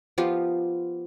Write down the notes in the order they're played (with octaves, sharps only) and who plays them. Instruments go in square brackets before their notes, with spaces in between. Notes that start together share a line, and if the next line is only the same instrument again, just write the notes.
[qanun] F3 B3 F4 G4